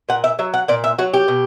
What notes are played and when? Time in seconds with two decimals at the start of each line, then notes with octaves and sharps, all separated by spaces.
0.09 A#2 F#5
0.24 E5
0.39 F#3 E5
0.54 F#5
0.68 A#2 D5
0.84 E5
0.98 F#3 F#4
1.14 G4
1.28 B2